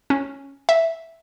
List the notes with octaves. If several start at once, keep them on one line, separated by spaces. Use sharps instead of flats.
C#4
E5